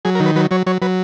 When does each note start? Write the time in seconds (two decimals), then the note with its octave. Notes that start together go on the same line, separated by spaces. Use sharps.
0.05 F#3 G#4
0.15 A#4
0.20 D#3
0.26 B4
0.36 F#3 B4
0.51 F#3 C#5
0.67 F#3 C#5
0.82 F#3 B4